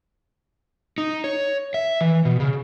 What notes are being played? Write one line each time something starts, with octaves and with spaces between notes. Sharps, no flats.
D#4
C#5
E5
E3
B2
C#3